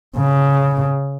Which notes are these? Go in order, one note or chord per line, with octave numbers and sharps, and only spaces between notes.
C#3